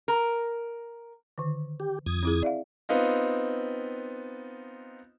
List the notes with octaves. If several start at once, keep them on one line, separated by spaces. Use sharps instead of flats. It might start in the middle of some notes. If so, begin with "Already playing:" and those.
A#4
D3 D#3
G4
F2 D#6 G#6
C4 E4 G#4
D5 E5 F5
B3 C4 D#4 F4